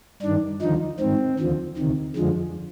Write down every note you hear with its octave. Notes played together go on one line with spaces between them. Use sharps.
G2 D#3 D4
D#2 D3 F3 D#4
G#2 D#3 C4
D#2 D3 F3
D2 C3 D#3
F2 D3 F3 G#3